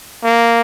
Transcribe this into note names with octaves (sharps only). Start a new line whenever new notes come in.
A#3